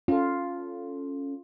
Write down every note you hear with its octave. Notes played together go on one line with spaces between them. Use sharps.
C#4 F4 A4